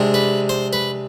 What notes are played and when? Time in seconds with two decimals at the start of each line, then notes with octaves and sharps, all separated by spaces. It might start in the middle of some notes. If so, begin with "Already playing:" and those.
Already playing: C3 G#3 D4
0.14 B4
0.49 C5
0.73 B4